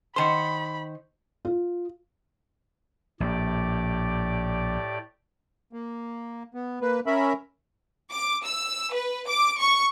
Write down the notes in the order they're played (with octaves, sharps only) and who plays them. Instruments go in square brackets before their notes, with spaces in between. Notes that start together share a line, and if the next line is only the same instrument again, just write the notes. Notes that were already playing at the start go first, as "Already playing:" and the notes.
[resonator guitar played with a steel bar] D#3 C5 [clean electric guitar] F#5 A5 C6 [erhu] B5
[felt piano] F4
[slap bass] A#1 [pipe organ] A2 G4 D5
[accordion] A#3
B3
A#3 B4
C#4 A#4 E5 B5
[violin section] D6
E6
B4
D6
C#6